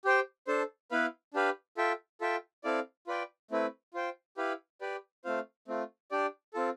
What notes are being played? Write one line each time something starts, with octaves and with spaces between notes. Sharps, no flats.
G4 C5 G5
D4 A4 C5
B3 E4 B4 F5
D4 G4 B4 F5
F4 A4 E5 G5
F4 A4 E5 G5
C4 E4 A4 D5 F5
F4 B4 D5 G5
A3 C4 E4 B4
F4 C5 G5
E4 G4 B4 F5
G4 B4 D5
A3 C4 F4 C5 F5
A3 C4 F4
D4 G4 D5
C4 F4 A4